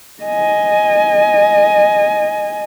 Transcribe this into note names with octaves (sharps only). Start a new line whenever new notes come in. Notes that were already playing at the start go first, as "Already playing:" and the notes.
D#5 G#5